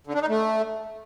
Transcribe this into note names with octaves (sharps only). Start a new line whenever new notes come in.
D3
D4
D#4
A3